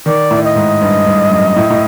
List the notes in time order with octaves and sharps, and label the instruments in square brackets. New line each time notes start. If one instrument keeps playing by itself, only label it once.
[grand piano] D#3 [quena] D5
[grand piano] A2
[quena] D#5
[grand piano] G#2
G2
G2
F#2
A2
A2